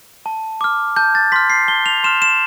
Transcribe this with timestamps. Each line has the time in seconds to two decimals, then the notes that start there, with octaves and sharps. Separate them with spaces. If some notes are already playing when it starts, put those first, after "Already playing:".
0.26 A5
0.61 D6 F6
0.96 A5 G6
1.15 A6
1.32 C6 F6 B6
1.50 C7
1.68 A5 G7
1.86 F7
2.04 C6 F6 E7
2.22 E7